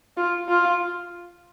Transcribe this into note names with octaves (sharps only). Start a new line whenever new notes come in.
F4
F4